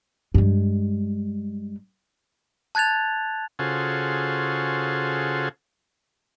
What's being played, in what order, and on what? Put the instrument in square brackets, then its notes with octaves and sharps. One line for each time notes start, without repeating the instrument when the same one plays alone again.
[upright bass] G2 G#3
[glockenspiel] A5 F#6 G#6 A6 F7
[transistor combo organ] C#3 F4 F#4 G#4 A4 C5